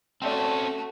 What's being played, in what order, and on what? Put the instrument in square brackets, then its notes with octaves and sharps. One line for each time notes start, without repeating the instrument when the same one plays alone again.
[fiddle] A3 F#4 [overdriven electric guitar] C4 C#4 [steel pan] D5 E5 G5 [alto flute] A5